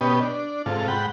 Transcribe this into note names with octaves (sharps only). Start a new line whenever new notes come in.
B2 B3 C#4 G4 D#5
D4
G#2 C3 F4 A4
G#2 F#5 G5 B5